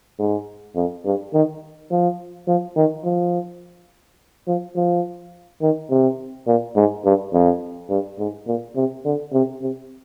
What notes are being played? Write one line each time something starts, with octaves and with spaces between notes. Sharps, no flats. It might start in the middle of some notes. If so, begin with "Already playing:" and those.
G#2
F2
G2
D#3
F3
F3
D#3
F3
F3
F3
D#3
C3
A#2
G#2
G2
F2
G2
G#2
A#2
C3
D3
C3
C3